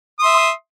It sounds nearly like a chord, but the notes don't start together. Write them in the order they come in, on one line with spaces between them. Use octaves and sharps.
D#6 C6 E5